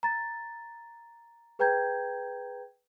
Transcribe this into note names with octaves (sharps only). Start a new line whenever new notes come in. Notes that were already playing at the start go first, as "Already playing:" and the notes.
A#5 A6
G#4 B4 G5 A#5 G6 G#6